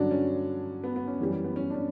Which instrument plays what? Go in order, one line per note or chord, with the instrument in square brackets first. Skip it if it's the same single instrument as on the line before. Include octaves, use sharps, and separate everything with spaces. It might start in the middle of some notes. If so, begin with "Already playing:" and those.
Already playing: [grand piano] G2 D3 F#3 C#4 D4
C#4
B3
B3
C#4
F#2 E3 G3
B3
C#4
D4
C#4